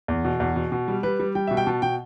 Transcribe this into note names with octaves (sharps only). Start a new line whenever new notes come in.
E2
B2
E2
B2
B2
G3
G3 B4
G3
G3 G5
B2 E5
G5
B2 A5
B2 G5